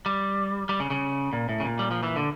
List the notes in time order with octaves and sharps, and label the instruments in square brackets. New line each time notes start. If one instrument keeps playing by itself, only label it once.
[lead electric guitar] G3
G3
C#3
C#3
A#2
A2
C#3
A#2
G3
F3
E3
D3